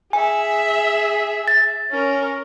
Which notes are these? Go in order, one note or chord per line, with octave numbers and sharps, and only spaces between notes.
G#4 E5 G#5
A6
C#4 A#4